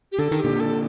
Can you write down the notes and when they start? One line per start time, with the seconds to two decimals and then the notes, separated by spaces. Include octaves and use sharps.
0.12 G4
0.18 D3 A4
0.31 D#3
0.40 A#2 D3 G4
0.60 A4